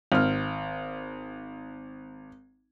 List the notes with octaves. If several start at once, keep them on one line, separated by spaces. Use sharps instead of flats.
G#1 F6